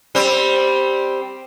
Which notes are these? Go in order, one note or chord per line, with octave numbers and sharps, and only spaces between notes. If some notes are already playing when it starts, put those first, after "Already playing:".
G3 C4